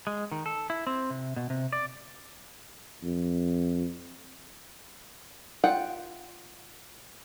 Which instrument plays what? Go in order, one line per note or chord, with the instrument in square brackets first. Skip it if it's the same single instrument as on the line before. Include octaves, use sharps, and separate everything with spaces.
[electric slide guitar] G#3
D#3
A4
E4
C4
C3
B2
C3
D5
[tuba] F2
[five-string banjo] F4 F#5 G5